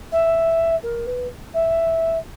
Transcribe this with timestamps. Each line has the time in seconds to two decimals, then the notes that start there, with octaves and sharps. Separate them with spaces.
0.11 E5
0.82 A#4
1.06 B4
1.53 E5